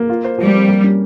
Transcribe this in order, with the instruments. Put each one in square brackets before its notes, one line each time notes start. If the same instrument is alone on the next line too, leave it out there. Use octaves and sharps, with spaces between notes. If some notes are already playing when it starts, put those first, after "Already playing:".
Already playing: [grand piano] A#3
F4
C5
[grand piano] F3 [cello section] G3
[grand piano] C4
A#3
C#4